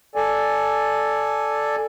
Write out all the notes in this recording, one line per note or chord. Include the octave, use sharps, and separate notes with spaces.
A4 D5 G#5